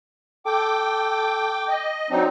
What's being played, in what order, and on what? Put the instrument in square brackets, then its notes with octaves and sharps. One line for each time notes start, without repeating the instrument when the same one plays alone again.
[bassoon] A4 [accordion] G5 D6
[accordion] D#5
[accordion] F#3 C4 D#4 [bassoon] D4